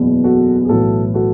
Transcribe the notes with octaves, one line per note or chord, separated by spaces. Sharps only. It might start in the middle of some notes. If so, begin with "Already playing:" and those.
Already playing: F#1 E2 B2
F#4 A4
G#4
B1 A2 E3 F#4 A4
F#4 A4